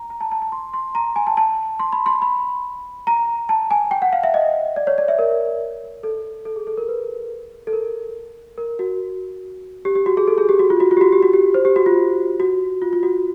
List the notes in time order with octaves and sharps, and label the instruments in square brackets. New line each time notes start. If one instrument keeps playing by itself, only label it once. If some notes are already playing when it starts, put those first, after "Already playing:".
Already playing: [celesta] A#5
A#5
A5
A5
A5
C6
C6
A#5
G#5
A5
A5
C6
B5
C6
B5
A#5
A5
G#5
G5
F#5
F5
E5
D#5
D5
C#5
D5
E5
A#4
A4
A4
G#4
A4
A#4
B4
A4
A#4
A#4
F#4
G4
G4
F#4
G#4
A4
G#4
G4
F#4
F4
F#4
F4
G4
F#4
G4
F#4
G4
C5
G4
F#4
F4
F#4
F4
F4
F#4